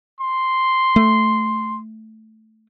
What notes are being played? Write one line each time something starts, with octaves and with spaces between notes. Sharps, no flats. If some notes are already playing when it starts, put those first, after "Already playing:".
C6
A3